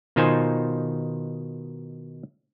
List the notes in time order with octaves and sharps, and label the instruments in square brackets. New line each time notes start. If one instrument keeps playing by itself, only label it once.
[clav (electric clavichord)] B2 D#3 D#4 F4 C5 G#5